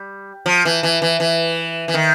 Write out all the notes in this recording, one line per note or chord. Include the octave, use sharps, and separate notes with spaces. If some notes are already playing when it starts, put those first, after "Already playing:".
Already playing: G3
F3
E3
E3
E3
E3
E3
D#3